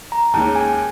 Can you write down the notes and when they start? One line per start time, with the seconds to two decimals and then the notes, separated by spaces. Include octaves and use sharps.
0.12 A#5
0.34 D#2 D#3 G#3 C#4 A5
0.56 G#5